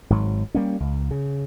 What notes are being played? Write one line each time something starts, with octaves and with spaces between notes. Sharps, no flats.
G#1 G#2 F#3
G3 A#3 C#4
C#2
C#3